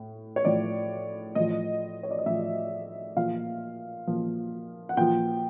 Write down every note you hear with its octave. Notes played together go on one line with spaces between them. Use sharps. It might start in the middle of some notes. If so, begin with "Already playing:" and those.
Already playing: A2
C#5
A2 F3 D5
A2 F3 D#5
C#5
D5
D#5
A2 F3 E5
A#2 F3 F5
A#2 F3
F#5
A#2 F3 G5